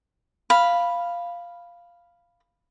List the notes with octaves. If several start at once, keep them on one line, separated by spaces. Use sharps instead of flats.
F5 B5